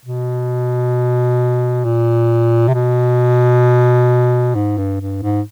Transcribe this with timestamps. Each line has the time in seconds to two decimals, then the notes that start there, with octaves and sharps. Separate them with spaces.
0.05 B2
1.84 A#2
2.68 C3
2.74 B2
4.55 G#2
4.77 G2
5.00 G2
5.23 G#2